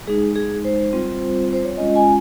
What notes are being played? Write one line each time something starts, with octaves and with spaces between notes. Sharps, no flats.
G#3 D#4 G#4
G#4
C5
G3 C4 F4
C5
C#5
G#3 C#4 F4 D#5
G#5